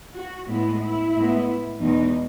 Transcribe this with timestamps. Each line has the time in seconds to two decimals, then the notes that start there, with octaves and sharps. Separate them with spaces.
0.15 F#4
0.48 A2 G#3 B3 E4
0.81 E4
1.15 A2 G#3 B3
1.81 E2 B2 G#3 D#4